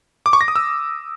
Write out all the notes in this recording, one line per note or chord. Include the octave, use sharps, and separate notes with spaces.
D6
C#6
A#6
D#6
E6